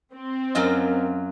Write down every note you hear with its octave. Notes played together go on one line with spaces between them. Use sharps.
C4
F#2 F#3 F4 A#4 D#5